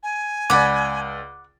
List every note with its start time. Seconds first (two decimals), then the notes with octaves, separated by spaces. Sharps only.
0.03 G#5
0.50 C#2 D5 F#5 B5 D6